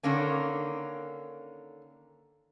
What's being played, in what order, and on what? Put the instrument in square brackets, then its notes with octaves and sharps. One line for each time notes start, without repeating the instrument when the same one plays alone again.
[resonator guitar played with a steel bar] D3 D#3 A#3 C#4